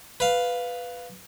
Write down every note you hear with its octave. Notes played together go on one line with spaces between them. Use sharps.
B4 F5